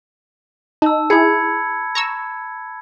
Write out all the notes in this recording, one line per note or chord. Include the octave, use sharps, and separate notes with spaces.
D#4 A5 E6
E4 G#4 B5 G#6 C#7
A#5 C#6 E6